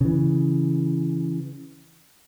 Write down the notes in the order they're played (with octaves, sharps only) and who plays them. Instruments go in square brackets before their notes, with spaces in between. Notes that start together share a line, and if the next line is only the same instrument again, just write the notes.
[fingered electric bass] C#3 E3